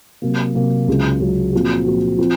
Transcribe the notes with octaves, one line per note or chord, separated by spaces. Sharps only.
C3 F#3 A#3
C3 F#3 A#3
C#2 C#3 F#3
C#2 C#3 F#3
A#2 F3 C4 F#4
A#2 F3 C4 F#4
F3 C4 F4